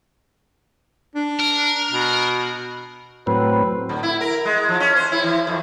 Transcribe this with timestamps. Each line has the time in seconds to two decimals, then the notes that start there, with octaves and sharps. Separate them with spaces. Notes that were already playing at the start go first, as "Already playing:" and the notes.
1.16 D4
1.39 A#4
1.92 B2
3.27 A2 F#3 C4 B4
3.89 D3
4.03 E4
4.21 A#4
4.45 G#3
4.69 F3
4.80 C#4
4.96 C5
5.12 E4
5.24 E3
5.47 F2